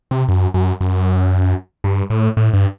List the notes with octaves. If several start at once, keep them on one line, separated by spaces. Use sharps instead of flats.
C3
F#2
F#2
F#2
G2
A2
A2
G2